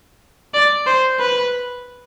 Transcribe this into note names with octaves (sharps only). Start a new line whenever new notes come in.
D5
C5
B4